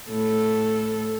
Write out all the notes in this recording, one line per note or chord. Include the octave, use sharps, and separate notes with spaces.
A2 A4